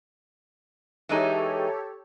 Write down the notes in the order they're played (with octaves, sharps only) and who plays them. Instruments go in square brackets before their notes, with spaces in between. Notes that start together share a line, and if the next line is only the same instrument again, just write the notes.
[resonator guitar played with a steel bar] E3 G#3 D#4 [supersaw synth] G4 A4 C#5